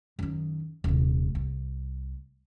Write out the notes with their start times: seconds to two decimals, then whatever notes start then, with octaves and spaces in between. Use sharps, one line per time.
0.19 F#2 D#3
0.84 D#1 C3
1.35 C2